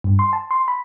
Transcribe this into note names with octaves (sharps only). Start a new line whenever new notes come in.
G2
C6
A5
C6
B5